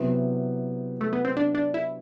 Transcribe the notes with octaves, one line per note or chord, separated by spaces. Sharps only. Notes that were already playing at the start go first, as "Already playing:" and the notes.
Already playing: C3 F#3 B3 E4 B4
A3
B3
C4
D4
D4
E4